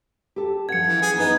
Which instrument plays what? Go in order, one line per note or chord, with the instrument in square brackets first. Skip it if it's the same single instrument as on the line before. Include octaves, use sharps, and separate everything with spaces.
[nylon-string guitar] G4 A4
[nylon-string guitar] F3 C#4 F#5 [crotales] G#6 C#7
[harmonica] E3
G#4
[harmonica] B3 [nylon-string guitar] D#4 B4 D#5 [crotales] G#6